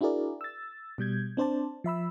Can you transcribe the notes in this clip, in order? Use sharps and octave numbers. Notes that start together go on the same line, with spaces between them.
D4 E4 F#4 G#4 A#4 D5
E6 A6
B2 G3 G6 G#6
C4 D4 C5 D5 A5
F3 E5 B5 E6